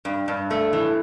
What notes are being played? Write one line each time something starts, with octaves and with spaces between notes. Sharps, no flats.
G2
G2
A3
E3